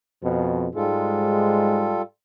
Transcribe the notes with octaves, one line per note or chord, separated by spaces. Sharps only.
F2 B2
G#2 G3 G#3 F4 A4